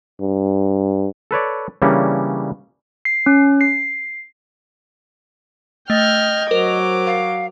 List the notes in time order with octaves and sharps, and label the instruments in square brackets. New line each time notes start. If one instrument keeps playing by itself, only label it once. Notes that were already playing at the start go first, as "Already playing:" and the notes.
[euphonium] G2
[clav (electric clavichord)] A4 B4 C#5 D5
C#3 E3 G3 A#3 C#4 D4
[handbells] C7
C#4
C7
[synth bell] A3 [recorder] D#5 [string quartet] G5 F6 G#6
[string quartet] F#3 D6 [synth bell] A#4 C5 F7
[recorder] F5